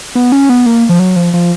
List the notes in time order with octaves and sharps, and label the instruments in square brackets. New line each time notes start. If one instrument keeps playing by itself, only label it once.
[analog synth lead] B3
C#4
B3
A#3
F3
F#3
F3
F3